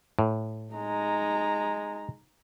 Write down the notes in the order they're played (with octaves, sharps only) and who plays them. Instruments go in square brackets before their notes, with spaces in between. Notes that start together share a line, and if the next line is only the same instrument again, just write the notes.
[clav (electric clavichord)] A2
[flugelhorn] G#3 [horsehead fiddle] D#4 A#5